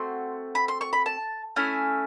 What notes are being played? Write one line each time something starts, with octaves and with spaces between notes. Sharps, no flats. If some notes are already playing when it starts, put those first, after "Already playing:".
Already playing: A3 C4 F#4 C6
B5
C6
C#6
B5
A5
A3 C#4 E4 G#5